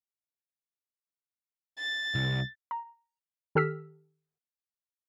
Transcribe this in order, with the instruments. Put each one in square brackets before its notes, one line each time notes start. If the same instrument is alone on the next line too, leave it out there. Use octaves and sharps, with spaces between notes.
[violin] A6
[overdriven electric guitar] C2
[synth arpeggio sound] A#5
D#3 G4 A4 E6 F6 B6